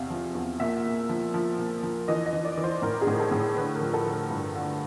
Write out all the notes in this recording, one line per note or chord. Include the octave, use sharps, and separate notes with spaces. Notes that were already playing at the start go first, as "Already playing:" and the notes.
Already playing: E2 C3 E5 F5
F3
E2
A#2 E5
A#2
F3
F3
A#2
F3
E3 D#5
D#5
E3
D5
E3
C5
A2 A#4
G#4
A2
A4
A2
D3 B4
A#4
F3
A4
D3
A#4
G2
D3